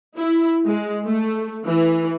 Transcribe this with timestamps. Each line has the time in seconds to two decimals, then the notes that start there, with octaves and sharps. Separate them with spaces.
0.17 E4
0.66 G#3
1.05 A3
1.66 E3